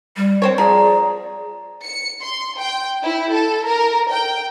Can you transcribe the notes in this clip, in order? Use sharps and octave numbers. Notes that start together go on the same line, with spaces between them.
G3
C4 C5 C#5
F3 G#4 D5 A#5
C#7
C6
G5
E4
A4
A#4
G5